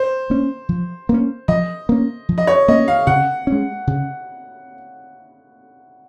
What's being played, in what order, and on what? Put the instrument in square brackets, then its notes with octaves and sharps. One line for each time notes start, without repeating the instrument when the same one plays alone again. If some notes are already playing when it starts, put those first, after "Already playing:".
Already playing: [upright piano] C5
[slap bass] A#3 C#4
F3
A#3 C#4
[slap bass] F3 [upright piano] D#5
[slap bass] A#3 C#4
F3
[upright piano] D#5
C#5
[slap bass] A#3 C#4 [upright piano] D#5
[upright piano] F5
[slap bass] C#3 [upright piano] F#5
[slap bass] C#4
G#3
C#3